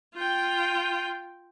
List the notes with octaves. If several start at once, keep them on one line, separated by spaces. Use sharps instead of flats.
F4 G5